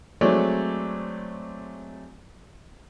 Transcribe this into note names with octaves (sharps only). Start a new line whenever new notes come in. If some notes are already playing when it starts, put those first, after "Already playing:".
F#3 G#3 A3 C4 C#5 D5